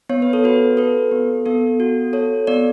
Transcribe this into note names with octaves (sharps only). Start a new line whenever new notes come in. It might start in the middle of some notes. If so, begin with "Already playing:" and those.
B3 C#5
B4
A4
F#4 B4
A4 B4
B3
B3 A4
F#4
A4 C#5
B3 D5